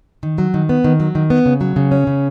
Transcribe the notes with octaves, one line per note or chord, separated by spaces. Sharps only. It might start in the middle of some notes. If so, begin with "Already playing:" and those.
D#3
F#3
D#3
B3
D#3
F#3
D#3
B3
C#3
F#3
C#3
C#4
C#3